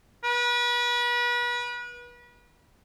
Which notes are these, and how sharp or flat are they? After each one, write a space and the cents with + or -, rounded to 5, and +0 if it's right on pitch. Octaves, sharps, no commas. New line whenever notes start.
B4 -35